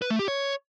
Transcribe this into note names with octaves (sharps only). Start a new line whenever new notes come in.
B4
A3
G4
C#5